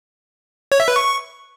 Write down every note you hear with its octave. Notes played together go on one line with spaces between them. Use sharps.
C#5
E5
B4
C#6